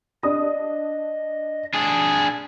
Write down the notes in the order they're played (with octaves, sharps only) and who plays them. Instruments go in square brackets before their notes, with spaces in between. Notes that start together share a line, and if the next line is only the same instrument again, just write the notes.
[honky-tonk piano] D4 D#6 [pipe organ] D#5
[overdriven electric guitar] D4 G#4